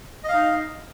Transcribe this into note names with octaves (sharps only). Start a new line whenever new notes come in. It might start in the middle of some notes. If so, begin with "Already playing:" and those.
D#4 D#5 F5